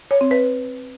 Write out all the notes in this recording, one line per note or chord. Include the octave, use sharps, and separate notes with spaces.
C#5
C4
B4